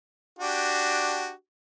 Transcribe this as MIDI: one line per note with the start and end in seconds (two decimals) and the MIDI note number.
0.39 1.31 62
0.39 1.31 66
0.39 1.31 67